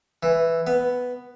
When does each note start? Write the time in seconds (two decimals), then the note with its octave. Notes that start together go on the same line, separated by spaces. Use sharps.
0.23 E3
0.67 B3